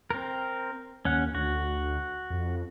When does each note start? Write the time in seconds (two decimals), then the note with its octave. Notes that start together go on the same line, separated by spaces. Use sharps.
0.10 C4 A#4
1.05 D#2 C#4 F#5
1.35 D2 F#4
2.30 F2